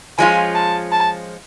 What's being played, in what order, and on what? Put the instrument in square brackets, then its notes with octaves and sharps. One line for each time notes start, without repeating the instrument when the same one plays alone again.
[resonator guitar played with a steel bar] F3 G#3 C#4 F4 [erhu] G#5
[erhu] A5
A5